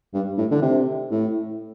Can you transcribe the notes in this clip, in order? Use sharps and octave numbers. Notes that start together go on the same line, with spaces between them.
G2
A2
D3
C3
A2